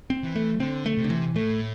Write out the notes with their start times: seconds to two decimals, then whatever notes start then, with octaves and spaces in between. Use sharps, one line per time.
0.10 C4
0.23 E3
0.36 A3
0.60 D3 C4
0.86 A3
0.97 C3
1.04 D3
1.10 E3
1.35 A2 A3